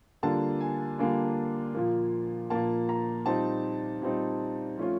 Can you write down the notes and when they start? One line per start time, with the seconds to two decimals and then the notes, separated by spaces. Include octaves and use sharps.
0.23 D3 G3 A#3 D4 F4 A5
0.61 G#5
0.98 D3 G3 A#3 D4 F4 G#5
1.74 A#2 F3 A#3
2.50 A#2 F3 A#3 A5
2.89 A#5
3.26 A#2 G3 C4 D#4 A5
4.02 A#2 G3 C4 D#4
4.78 F3 A3 C#4 F4